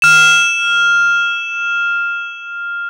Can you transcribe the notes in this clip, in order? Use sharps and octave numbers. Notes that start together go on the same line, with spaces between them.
F6 E7